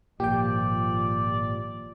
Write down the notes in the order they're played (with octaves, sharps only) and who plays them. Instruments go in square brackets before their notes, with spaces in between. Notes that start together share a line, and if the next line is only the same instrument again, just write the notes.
[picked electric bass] G#1 A#2 [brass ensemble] F3 [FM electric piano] G4 G5 [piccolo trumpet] D5